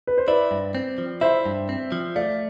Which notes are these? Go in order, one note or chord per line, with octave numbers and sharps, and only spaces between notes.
B4
C5
E4 B4 D5
G2
C4
F3
E4 C5 E5
G2
C4
F3
A3 D5 F5